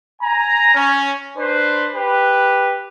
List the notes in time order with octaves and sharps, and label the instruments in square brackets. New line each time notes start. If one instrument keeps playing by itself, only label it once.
[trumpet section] G#5 A#5
C#4
D4 B4 C5
G4 B4